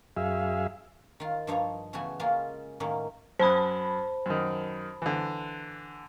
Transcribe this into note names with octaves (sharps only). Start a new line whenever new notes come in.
F#2 G#4 E5 F5
D#3 F4
G2 F3 D#4 C#5 A#5
C#3 E3 A3 B3 F#4 G#5
G#3 A#3 C#4 F4
A2 D#3 F#3 A#3 C#4
F#2 C5 A5 B5 D#6
F#2 D#3
D3 E3